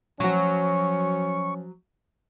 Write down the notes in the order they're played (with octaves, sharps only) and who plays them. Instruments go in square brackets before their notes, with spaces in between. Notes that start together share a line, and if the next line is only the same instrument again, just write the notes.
[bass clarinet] F3 [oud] F#3 F#4 [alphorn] C#4 [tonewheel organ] C#6